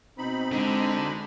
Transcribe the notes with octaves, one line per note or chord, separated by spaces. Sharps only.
B2 C4 D#4 B5
D3 G#3